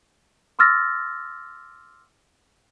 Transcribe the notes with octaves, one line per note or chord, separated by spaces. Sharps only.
C6 D6 E6 F6 A6 A#6